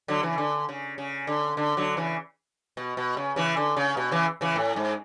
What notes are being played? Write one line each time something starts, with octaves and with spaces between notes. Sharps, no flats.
D3 F#3
C#3 E3
D3
C#3
C#3
D3
D3
D3 F#3
C#3 E3
B2
B2
C#3
C#3 E3
D3
C#3
B2
C#3 E3
C#3 E3
A2
G#2